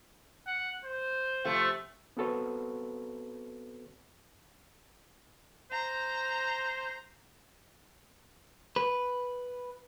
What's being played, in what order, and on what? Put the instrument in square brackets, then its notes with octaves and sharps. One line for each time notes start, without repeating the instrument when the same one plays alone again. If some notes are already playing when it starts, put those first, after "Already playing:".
[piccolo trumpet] F#5
C5
[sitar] C3 F3 A3
[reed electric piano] B3 C4 F#4 A4 B4 C#5
[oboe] C5 [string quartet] A#5
[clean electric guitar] B4